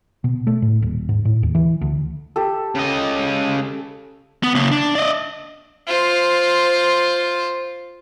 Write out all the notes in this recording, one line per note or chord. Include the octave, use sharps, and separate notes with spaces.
B2
A3
A2
D#1
G#2
A2
D#2
E3
D2
G4 A4
C#3 D#5
B3
C#3 A#3
D4
D5 D#5
F4 C5